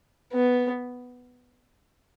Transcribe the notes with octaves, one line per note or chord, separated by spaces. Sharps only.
B3